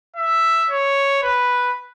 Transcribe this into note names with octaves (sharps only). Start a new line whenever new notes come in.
E5
C#5
B4